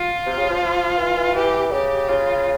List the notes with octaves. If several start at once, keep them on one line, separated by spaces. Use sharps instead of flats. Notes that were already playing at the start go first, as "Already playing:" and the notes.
Already playing: F4
C3
C#3
F3
F3
E3
E3
E3 G4
C#3 G4
C#3 F4